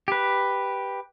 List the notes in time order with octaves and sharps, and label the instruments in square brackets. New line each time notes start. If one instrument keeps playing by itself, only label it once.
[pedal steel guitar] G4 B4